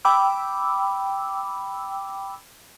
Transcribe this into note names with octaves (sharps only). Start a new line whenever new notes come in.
G5 B5 D6 E6